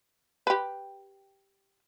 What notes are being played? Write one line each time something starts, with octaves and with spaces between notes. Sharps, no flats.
G4 B4